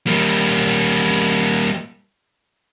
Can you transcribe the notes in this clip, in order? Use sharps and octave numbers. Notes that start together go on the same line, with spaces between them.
G3 A#3